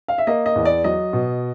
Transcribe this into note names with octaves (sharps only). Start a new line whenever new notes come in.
F5
E5
A#3 D#5
D#5
E2
D5
F#3 D#5
B2